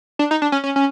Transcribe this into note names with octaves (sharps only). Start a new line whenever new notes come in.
D4
D#4
D4
C#4
C#4
C#4